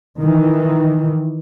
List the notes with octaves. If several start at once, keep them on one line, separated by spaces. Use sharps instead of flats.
D#3 E3